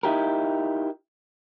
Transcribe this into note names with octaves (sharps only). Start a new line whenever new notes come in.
D#4 E4 G4 A#4